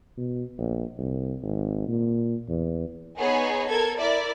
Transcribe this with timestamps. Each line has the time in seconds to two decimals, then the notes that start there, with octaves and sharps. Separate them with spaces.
0.17 B2
0.59 A#1
0.98 C2
1.42 G#1
1.88 A#2
2.48 E2
3.18 B3 D#4 G#4 C#5
3.69 A4 A#4 G#6
3.99 E4 A#4 D5 E5